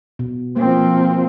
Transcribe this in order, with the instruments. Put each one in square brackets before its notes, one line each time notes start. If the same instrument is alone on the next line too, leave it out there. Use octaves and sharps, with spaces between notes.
[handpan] B2
[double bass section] F3 C4 [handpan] A#3